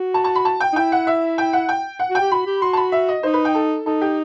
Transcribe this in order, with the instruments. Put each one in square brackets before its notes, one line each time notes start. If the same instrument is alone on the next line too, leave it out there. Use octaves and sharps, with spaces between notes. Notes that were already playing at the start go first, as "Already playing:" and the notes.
Already playing: [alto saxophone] F#4
[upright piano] A5
A5
B5
A5
G5
[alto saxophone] D#4
[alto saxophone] E4 [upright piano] G5
[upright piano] F#5
E5
G5
F#5
G5
F#5
[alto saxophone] F#4
[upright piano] G5
[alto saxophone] G4
[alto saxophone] F#4 [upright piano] B5
[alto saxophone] G4
[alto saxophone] F#4 [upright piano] C6
[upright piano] A5
B5
E5
D#5
[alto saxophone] D#4 [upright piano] C5
[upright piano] B4
G5
A4
[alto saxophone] D#4 [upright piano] A4
[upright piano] G4